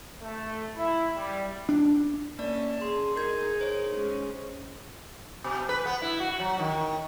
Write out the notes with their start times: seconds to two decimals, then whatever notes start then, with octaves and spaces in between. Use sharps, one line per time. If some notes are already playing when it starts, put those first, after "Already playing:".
0.22 A3
0.76 E4
1.16 G3
1.69 D4
2.39 A#3 C#4 D5 A5
2.81 G#4 C6
3.16 D#4 G#4 A#4 G6 G#6
3.61 C5 C#5
3.96 G#3 C#4
5.44 B2
5.69 B4
5.86 B3
6.02 E4
6.20 F#4
6.40 F#3
6.59 D#3